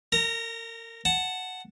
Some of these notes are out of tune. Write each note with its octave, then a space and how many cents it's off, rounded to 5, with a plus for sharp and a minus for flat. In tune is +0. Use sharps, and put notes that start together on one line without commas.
A#4 -30 A#5 +0
F#5 +0 A5 +0